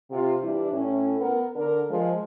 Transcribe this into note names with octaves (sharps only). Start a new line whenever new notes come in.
C3 F4
E3 G3 D4 E4
A2 C#4
B3 A#4
D3 D4 A#4
F3 G#3